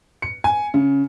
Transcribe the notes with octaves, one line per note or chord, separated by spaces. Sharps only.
C#7
G#5
C#3